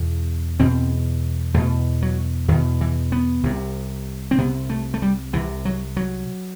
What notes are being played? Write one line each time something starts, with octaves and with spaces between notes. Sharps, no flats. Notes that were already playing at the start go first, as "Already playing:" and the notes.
Already playing: E2 B2
E2 B2 C4
E2 B2 A3
F#3
E2 B2 D#3
E3
B3
C2 C3
C4
C2 C3 B3
A3
A3
G3
C2 C3 E3
F#3
F#3